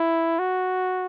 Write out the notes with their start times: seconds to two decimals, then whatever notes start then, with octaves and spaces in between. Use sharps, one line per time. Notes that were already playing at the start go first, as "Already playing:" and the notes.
Already playing: E4
0.39 F#4